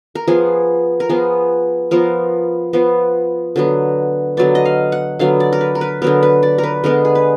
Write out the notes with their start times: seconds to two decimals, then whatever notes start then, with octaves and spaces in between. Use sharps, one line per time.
0.15 A#4
0.28 F3 B3 G#4
1.00 A#4
1.09 F3 B3 G#4
1.91 F3 B3 A#4
2.73 F3 B3
3.56 D3 F#3 B3
4.37 D3 F#3 B3 D5
4.55 D#5
4.65 F5
4.92 F#5
5.19 D3 F#3 B3 F5
5.40 D5
5.53 A#4
5.61 B4
5.75 A#4
5.81 B4
6.02 D3 F#3 B3 A#4
6.23 B4
6.43 D5
6.58 A#4
6.64 B4
6.84 D3 G#3 B3 A#4
7.05 G#4
7.15 B4